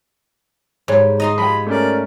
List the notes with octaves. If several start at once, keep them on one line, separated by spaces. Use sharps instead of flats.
G#2 G3 C#5
D#4 D#5 A#5 C6
F3 G#3 G4 B5
A3 C#4 A#4 D5